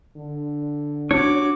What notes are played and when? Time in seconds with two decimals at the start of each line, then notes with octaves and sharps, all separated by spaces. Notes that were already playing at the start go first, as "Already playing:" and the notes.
0.17 D3
1.11 D4 F#4 C#5 D6